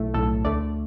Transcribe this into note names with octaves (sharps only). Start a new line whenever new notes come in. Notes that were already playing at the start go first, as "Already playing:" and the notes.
Already playing: B1 A2 A3
B1 A2 A3 A4
D2 D3 A3 D5